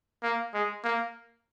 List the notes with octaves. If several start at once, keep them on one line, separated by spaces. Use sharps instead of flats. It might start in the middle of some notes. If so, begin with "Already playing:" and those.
A#3
G#3
A#3